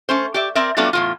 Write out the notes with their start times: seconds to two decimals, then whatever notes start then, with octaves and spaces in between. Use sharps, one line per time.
0.09 A3 C#4 C5
0.34 G4 D5 E5
0.55 C4 A#4 D5 E5
0.77 F#3 G3 A3 B3 D4 F4
0.93 E2 A2 F4